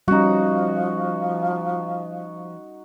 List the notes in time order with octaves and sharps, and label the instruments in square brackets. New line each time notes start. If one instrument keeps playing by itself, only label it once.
[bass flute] F3 [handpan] G3 C#4 [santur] D#4 F#4